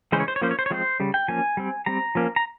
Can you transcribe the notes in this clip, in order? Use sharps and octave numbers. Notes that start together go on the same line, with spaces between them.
C#3 E3 G#3 C#4 C5
C#5
C5
C#5
F3 A#3 C#4 C5
C#5
C5
C#5
F3 G#3 C4 C5
C#3 G3
G5
F3 A#3 C#4 G#5
G3 C4
G3 C4 A#5
F3 A#3 C#4
A#5